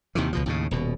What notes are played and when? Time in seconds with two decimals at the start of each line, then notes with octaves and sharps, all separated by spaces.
0.15 D#2 C3 D#3 E3
0.33 C#2 B2 F3
0.46 D#2 A2 C#3
0.71 D#1 B2